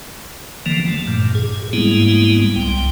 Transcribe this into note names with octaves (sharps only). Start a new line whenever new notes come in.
D3 E3 F3 A#3
A3
G2 A#2
G#4
G#2 G3 G#3 A#3 B3 E4
C2 G3 G5